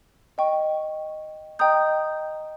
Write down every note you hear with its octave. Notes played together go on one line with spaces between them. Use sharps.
D#5 G5 C#6
D#5 G5 A#5 D#6 G6